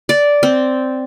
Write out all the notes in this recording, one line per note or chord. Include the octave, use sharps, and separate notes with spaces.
D5
C4